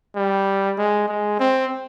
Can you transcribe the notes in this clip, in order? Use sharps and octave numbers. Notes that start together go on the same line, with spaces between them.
G3
G#3
G#3
C4